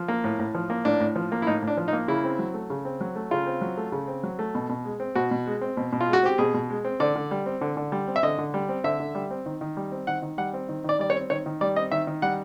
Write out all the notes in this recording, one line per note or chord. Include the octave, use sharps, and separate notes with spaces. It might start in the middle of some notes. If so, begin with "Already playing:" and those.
Already playing: F3
A#3
A2
A2
F3
A#3
A2 D4
A2
F3
A#3
E4
A2 D#4
A2 D4
F3
D#4
A#3
C#3 E4
C4
F#3
A3
C#3
C4
F#3
A3
C#3 F4
C4
F#3
A3
C#3
C4
F#3
A3
B2
B2
G#3
C4
B2 F#4
B2
G#3
C4
B2
B2
F4
G#3 F#4
C4 G4
B2 G#4
B2
G#3
C4
D3 D5
D3
G3
C4
D3
D3
G3
C4
E5
D3 D#5
D3
G3
C4
D3 E5
D3
G3
C4
D#3
D#3
G3
C4
D#3 F#5
D#3
G3 F#5
C4
D#3
D#3 D5
G3 D5
C#5
C4
D#3 C#5
D#3
G3 D5
C4 D#5
D#3 E5
D#3
G3 F#5